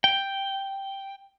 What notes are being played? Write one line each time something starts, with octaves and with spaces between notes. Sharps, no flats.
G5